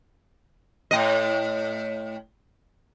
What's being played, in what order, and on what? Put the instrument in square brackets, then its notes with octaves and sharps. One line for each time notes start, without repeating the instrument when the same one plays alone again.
[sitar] A2 D#5